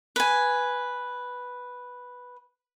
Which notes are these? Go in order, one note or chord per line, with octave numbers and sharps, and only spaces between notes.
B4 G#5